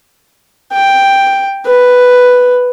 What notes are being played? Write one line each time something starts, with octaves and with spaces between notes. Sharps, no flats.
G5
B4